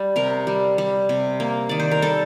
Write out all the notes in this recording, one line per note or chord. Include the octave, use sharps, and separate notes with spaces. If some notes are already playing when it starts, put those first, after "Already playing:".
Already playing: G3
C3 A#4
G3
G3
C3
A#3
D#3 D5
C5
A#4
G3 A4